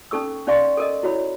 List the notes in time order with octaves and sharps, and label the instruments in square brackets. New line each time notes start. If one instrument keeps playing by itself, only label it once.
[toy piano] C#4 D#4 A4 C#6 E6
C#4 D#4 D5 F5 C6 C#6
A4 A#4 D#5
E4 F#4 C#5 B5